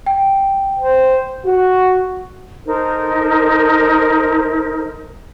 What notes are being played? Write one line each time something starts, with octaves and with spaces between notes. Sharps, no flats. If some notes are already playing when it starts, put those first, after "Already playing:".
G5
C5
F#4
D#4 A4 A#4 C5